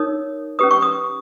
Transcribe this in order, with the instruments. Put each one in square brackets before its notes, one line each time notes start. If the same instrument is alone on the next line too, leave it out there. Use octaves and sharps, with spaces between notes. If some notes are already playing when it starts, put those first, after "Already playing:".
Already playing: [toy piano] D#4 A#4 C#5 D#6
C#4 G4 B4 D#6
C#6
D#6